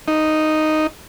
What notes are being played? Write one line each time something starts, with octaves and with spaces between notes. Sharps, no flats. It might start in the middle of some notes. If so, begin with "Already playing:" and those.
D#4